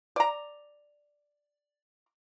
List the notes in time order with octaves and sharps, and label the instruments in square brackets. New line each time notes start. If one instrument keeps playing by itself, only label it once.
[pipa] D5 A#5